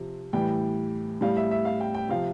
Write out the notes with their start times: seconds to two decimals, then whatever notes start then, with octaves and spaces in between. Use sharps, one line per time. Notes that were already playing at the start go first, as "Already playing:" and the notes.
Already playing: C3 F3
0.33 A2 E3 G3 G5
1.21 A2 G3 F5
1.37 E5
1.51 E5
1.65 F5
1.80 G5
1.95 G5
2.09 C3 F3 F5